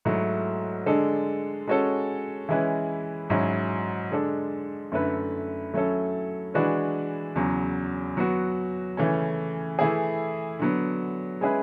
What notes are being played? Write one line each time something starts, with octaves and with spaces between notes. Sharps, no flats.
G#2 F#3 A3 E4
D3 G#3 D4 A4
G#3 C#4 F#4 A4 C#5
E3 G#3 C#4 E4 B4
G#2 F#3 C#4 E4
D3 G#3 D4 A4
F#2 D3 A3 E4 B4
F#3 A3 C#4 E4 A4
E3 G#3 D4 F#4 B4
E2 C#3 F#3
F#3 B3 F#4
C#3 E3 A3 C#4
E3 A3 E4 G#4
D3 F#3 B3
G#3 C#4 E4 G#4 B4